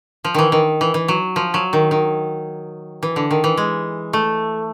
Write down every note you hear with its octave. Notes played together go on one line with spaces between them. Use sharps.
F3
D#3 E3
D#3
E3
E3
F#3
F3
F#3
D#3
D#3
E3
D3
D#3
E3
G#3
A3